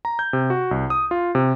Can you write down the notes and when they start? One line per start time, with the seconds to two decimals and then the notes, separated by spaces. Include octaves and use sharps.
0.05 A#5
0.19 G6
0.33 C3
0.50 F#4
0.71 C2
0.90 D#6
1.11 F4
1.35 C3